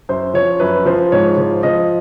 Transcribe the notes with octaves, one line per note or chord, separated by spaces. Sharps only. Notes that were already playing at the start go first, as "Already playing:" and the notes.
F#2 C5
F3 C#5
F#2 B4
F3 C5
G#2 C#5
F3
F3 D#5